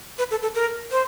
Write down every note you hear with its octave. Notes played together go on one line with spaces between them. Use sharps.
B4
A4
A4
A#4
C5